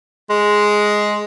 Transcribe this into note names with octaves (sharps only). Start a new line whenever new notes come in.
G#3